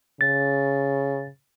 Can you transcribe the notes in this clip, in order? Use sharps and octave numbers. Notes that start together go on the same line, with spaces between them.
C#3 A6